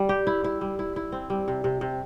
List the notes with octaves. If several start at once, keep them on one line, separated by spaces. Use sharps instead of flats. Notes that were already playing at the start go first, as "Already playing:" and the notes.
Already playing: G3
G4
E4
E4
G3
E4
E4
C4
G3
C3
C3
C3